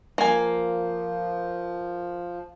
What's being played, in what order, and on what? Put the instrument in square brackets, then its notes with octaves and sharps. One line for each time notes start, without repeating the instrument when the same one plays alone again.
[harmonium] F3 [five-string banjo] A#3 G#5